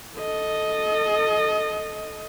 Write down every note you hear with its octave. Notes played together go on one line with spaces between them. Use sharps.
A4 D#5